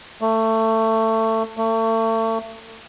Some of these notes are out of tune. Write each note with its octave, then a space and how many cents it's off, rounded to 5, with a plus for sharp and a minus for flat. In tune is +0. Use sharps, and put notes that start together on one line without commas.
A3 +20
A3 +35